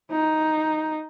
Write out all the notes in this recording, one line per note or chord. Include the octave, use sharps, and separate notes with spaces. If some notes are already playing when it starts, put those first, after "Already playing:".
D#4